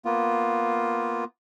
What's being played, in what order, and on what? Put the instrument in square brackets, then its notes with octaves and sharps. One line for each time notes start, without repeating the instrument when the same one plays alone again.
[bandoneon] A#3 B3 F4